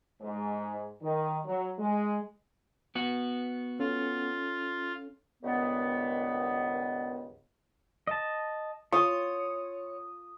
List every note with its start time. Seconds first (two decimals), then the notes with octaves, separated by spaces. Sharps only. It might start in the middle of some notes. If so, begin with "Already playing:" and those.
0.21 G#2
1.02 D#3
1.45 F#3
1.79 G#3
2.95 B3 F#4
3.79 C#4 F4 A4
5.43 C#2 G2 D#3 B3
8.07 D#5 A5
8.92 F4 C#5 D#6